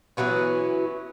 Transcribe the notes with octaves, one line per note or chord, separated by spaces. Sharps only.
E3 F#3 B3 C#4